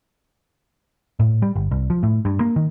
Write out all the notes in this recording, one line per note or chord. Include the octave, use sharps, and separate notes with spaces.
A2
G3
G1
C2
F3
A2
G2
A#3
D#3